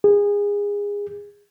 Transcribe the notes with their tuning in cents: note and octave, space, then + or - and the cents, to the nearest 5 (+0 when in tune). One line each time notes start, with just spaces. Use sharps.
G#4 -25